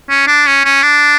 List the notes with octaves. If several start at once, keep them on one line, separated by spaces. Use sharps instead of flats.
C#4
D4
C#4
C#4
D4